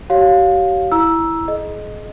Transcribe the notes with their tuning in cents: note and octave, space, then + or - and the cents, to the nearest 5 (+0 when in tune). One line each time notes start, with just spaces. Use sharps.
G4 -40 C#5 +0 F5 +15
E4 +0 A#5 +20 E6 +0
G#4 +30 D#5 -5